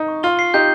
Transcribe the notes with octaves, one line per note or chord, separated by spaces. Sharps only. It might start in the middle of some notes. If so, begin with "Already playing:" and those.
Already playing: D#4
C#6
F4 G7
C7
D#4 G4 G6